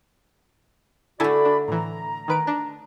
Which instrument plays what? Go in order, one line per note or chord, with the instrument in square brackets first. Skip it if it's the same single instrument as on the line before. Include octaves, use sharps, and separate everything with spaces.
[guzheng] D3 A3 [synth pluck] E4 A4 G#5 [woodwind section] F#4 D5 B5
[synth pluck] D4
[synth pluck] A2 E3 [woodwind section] A#5
[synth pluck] D#3 B4 D7
D4